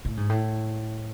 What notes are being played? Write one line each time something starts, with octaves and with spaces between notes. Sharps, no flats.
A2
G#2
A2